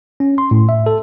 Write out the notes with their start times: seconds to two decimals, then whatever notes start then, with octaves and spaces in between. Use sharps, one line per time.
0.20 C#4
0.38 C6
0.51 A2
0.69 E5
0.86 A4